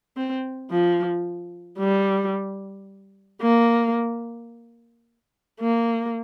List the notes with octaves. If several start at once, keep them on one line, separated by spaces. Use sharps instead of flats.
C4
F3
G3
A#3
A#3